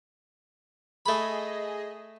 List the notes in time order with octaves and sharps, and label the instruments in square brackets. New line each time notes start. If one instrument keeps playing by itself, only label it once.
[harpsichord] A3 B5 [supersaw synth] G#4 D#5